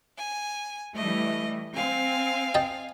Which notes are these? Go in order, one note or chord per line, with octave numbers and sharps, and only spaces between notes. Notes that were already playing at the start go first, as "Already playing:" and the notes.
G#5
E3 G3 A3 D#5
C4 F5 G#5
D#5 G5 A5